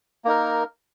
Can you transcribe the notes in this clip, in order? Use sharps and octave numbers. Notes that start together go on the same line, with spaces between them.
A#3 D#4 A#4